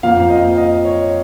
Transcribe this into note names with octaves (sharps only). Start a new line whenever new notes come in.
F2 F3 A#3 F5
D#5
D#5
C#5